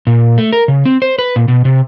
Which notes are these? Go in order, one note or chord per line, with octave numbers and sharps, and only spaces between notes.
A#2
A3
A#4
C#3
C4
C5
B4
A#2
B2
C3